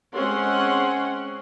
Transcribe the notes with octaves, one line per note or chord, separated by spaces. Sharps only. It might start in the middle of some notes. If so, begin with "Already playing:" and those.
G#3 C4 C#4 C#5 F#5 C6